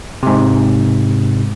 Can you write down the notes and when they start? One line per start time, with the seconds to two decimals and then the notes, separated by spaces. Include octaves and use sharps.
0.23 G#2 C3